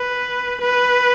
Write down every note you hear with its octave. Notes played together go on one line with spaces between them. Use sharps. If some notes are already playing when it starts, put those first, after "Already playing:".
Already playing: B4
B4